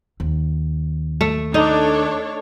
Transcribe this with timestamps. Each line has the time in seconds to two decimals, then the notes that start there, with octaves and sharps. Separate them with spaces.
0.20 D#2
1.21 A3
1.54 D4 D#4 A4 C#5